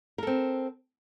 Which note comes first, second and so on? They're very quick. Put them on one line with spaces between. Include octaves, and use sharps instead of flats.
A#4 A4 C4